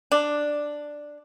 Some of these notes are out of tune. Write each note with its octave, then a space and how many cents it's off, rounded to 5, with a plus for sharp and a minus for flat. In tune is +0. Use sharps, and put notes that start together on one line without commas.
D4 +5